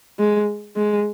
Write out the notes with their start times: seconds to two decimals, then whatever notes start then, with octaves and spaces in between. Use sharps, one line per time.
0.19 G#3
0.76 G#3